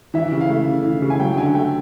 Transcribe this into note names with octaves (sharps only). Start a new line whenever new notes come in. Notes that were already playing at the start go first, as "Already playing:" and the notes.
E3 E5
C#3
F5
A3
C#3
E3
C#3
G#5
F#3 G5
D3 G#5
A3 G5